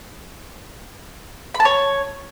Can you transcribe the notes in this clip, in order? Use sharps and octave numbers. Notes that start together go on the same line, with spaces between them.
B5
A5
C#5